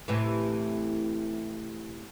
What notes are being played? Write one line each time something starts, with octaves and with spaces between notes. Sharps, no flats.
A2 C3 E3